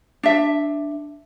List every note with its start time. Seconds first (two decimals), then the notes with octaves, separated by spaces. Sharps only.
0.23 D4 E5